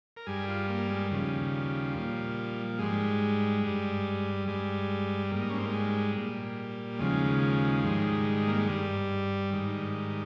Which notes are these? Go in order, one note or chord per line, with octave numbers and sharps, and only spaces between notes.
A#4
G2 G3 G#4
F4
A#3
G#3
D#2 C#3 F3 G3
A#2 F3
G#2 G3 G#3
G2 G3
G2 G3 G#3
G#2 G3 A#3
D#4
C#4
C4
A#3
G#3
A#2 G3
D#2 C#3 F3 G#3
G#2 D#3 G3
A#3
G#3
G2 G3
G#2 D#3 G3